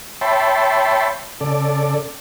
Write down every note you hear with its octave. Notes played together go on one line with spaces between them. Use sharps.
C#5 E5 G5 A5 B5 C6
C#3 A4 D5